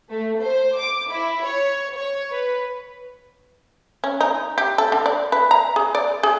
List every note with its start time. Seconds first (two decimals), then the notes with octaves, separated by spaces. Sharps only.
0.10 A3
0.41 C5
0.79 D6
1.10 E4
1.46 C#5
1.97 C#5
2.32 B4
4.04 C#4
4.21 D#4
4.58 G4
4.78 A4
4.92 D3
5.06 D5
5.32 B4
5.51 A#5
5.76 G#4
5.95 D5
6.23 G#4